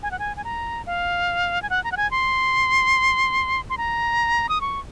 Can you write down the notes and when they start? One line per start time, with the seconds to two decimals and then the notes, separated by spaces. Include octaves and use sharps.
0.03 G#5
0.11 F#5
0.19 G#5
0.37 G#5
0.44 A#5
0.86 F5
1.62 G#5
1.70 F#5
1.84 A#5
1.92 F#5
1.97 G#5
2.11 C6
3.70 C6
3.78 A#5
4.49 D#6
4.61 C#6